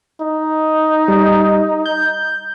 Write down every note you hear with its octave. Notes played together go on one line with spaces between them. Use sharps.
D#4
G3
G6